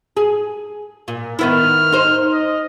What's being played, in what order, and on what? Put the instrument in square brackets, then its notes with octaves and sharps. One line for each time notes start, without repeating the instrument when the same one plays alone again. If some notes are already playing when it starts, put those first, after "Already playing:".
[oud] G#4
A#2
[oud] D#3 B3 E4 [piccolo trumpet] F6
[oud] D#4 C5
[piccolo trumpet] D#5